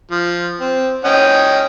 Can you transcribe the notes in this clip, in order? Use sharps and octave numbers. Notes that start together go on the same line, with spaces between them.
F3
C4
C#4 D#5 G5